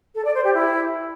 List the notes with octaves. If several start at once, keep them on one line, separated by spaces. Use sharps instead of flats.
A4
D5
C5
G4
E4